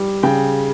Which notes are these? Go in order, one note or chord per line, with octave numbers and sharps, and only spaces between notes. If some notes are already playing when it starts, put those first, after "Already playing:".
Already playing: G3
C#3 G5